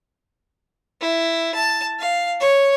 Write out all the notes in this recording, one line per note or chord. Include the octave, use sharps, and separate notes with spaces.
E4
A5
F5
C#5